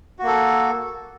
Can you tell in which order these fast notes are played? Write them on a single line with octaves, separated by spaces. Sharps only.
F#4 A#3 A4